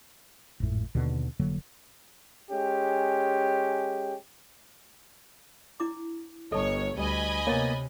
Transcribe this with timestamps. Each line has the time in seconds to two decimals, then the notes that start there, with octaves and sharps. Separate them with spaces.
0.60 G#1 F2 A2
0.95 D#2 B2 D3
1.39 F1 D3 F#3 A#3
2.51 G#3 C#4 G4
5.80 D4 E4 D6
6.52 G1 A4 C#5 D#5 A5
6.98 D2 G3 D#5 G#5 B5
7.47 C3 A#3 B3 C#5 A6